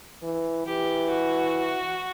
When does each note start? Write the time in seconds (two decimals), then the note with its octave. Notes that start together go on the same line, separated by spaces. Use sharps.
0.23 E3
0.66 E3 G4
1.10 F#4